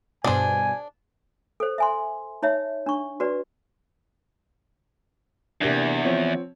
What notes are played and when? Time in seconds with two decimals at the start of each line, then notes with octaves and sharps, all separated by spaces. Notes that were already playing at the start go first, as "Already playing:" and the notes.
0.24 G2 B2 D4 G#4 C5 G#5
1.60 A4 C5
1.78 E5 G#5 C6
2.43 D#4 C#5 E5
2.86 D4 C#6
3.20 F#4 B4 D5
5.61 E2 C3 A#3 D4
6.04 F3 C4 C#5